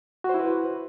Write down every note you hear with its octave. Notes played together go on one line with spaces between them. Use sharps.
E4 F#4 B4 C5